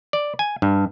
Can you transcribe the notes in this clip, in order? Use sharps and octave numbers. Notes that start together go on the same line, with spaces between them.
D5
G#5
G2